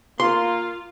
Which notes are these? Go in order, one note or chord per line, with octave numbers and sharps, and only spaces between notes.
A#3 F4 C6